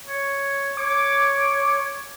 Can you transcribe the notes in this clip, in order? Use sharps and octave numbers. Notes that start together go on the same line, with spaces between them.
C#5
C#5 D6